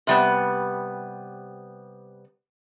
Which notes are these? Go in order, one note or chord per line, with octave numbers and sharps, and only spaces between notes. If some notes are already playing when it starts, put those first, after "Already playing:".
C3 G3 B3